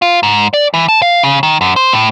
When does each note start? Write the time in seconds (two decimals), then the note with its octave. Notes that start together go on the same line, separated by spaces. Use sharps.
0.02 F4
0.23 G#2
0.54 D5
0.74 E3
0.89 A5
1.02 F5
1.23 C#3
1.43 D#3
1.61 F#2
1.76 C5
1.93 A2